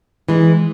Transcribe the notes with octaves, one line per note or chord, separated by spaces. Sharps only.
E3 G#3